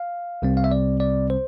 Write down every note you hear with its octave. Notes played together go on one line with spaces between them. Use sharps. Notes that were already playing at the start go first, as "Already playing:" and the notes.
Already playing: F5
C2 C3 G3 C4
F5
E5
D5
D5
C5